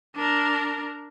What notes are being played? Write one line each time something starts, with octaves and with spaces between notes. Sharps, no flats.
D4 A#4